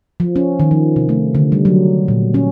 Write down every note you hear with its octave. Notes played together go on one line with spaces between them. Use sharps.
F3
C#4
D#3
F3
C3
A3
D3
G3
F#3
A#2
C#4